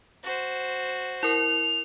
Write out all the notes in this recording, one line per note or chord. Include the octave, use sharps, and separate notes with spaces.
F#4 C5
E4 A#4 F7